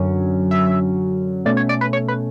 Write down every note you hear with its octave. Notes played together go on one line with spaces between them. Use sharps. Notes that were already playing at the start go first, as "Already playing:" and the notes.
Already playing: F#2 D3 F#3 C#4
E5
B2 A3 C#4 D5
C#5
D5
B4
C#5
B4